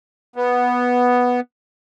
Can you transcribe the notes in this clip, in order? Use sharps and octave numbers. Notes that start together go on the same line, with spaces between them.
B3